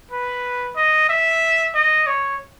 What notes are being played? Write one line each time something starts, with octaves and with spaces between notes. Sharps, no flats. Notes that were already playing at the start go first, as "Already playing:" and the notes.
B4
D#5
E5
D#5
C#5